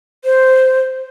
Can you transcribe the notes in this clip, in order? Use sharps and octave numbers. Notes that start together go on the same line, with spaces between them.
C5